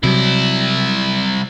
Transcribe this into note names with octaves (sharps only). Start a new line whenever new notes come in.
C2 C3 F#3 E4